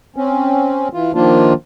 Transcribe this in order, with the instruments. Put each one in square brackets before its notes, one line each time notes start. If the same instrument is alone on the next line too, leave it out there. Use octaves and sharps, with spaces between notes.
[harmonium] C4 C#4
E3 F4
D#3 F3 A#3 D4 F4